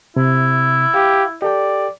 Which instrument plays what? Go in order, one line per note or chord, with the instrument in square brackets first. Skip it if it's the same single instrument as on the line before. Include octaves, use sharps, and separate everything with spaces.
[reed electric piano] C3 [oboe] E4
[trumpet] G4 [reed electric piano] F5
[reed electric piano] G4 A4 G5 [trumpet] D5